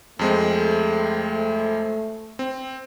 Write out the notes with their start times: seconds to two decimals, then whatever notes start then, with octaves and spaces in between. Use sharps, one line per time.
0.19 F2 G#3 A3 C4
2.39 C4